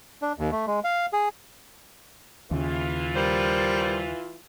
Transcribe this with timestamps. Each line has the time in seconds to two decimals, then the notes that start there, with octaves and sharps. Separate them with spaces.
0.22 D4
0.39 D#2
0.52 A3
0.67 G#3
0.84 F5
1.13 G#4
2.51 D#2 C#3 E3 F4
3.16 G3 A#4 C5